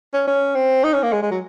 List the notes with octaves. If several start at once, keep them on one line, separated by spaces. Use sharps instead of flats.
C#4
C#4
C4
D#4
C#4
A#3
G#3
G#3
F#3